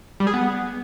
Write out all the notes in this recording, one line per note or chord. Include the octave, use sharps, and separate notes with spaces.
G3
G#4
B3